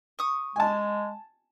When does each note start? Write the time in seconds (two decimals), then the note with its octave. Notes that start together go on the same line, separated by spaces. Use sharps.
0.19 C#6 D#6
0.56 G#3 G#5 A5